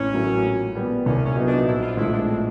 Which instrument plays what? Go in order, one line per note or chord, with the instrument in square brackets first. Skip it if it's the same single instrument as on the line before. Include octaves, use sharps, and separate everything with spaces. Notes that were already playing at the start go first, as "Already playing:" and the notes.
Already playing: [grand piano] A1 [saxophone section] C#4
[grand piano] A2 F#3 A#3
A#2
G3 B3
[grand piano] C2 [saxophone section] C#4
[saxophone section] C#4
[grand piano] A#2 F#3 B3 D#4
[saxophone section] D4
[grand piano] A#1 [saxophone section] E4
[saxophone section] F4
[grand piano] A2 F3 G#3 [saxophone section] E4
[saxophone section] D4
C4